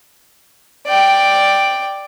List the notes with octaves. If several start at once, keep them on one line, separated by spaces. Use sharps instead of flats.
D5 G5